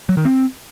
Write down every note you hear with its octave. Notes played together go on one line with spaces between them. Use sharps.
F#3
D#3
C4